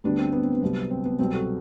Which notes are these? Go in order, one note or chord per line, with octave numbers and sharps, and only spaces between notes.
D2 D3 G3 B3 D4
C4
B3
C4
B3
C2 C3 F#3
C4
B3
C2 B2 F#3 C4
F#4 A4